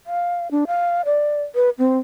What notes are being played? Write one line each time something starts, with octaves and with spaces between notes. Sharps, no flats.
F5
D4
F5
D5
B4
C4